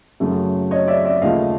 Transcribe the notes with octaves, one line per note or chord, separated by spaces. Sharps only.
F#2 C#3 F#3 A3
C#5 D#5
D5 E5
D5 E5
D#2 C#3 F3 A3 D#5 F5